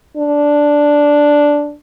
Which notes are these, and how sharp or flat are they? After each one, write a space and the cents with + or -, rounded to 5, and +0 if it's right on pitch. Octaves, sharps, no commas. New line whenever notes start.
D4 -5